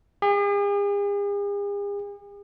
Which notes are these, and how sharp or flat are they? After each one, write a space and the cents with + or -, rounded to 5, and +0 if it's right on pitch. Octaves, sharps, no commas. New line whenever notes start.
G#4 -45